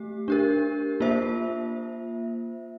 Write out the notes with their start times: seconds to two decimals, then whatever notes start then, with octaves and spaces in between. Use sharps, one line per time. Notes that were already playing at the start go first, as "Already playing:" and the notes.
Already playing: A3 G4
0.28 D4 G4 A#4
1.00 A#3 F4 C5 E5